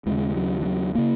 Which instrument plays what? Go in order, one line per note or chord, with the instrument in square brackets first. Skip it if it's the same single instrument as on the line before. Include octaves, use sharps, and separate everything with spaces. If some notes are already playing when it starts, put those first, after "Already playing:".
[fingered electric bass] D#2 C#3 G#3
F#3
E3
F#3
C#3 A#3